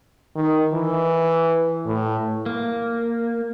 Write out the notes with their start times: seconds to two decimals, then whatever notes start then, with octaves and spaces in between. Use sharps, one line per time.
0.36 D#3
0.73 E3
1.86 A2
2.46 A#3